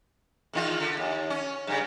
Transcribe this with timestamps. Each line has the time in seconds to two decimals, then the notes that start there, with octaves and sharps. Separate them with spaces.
0.53 E2 D#3 F4
0.80 D3
0.97 D#2
1.30 C#4
1.67 G2 C#3